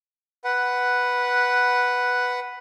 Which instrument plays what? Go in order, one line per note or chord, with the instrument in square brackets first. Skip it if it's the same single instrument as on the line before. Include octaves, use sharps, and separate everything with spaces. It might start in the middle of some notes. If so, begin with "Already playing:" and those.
[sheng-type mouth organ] B4 F#5